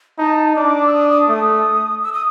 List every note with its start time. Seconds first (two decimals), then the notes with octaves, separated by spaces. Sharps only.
0.19 D#4 A5
0.56 D4 D6
0.87 E6
0.93 D#6
1.11 D#6
1.29 A3 D#6
2.03 E6
2.13 D#6